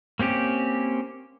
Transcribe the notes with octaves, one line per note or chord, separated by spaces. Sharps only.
A#3 C4 C#4 G4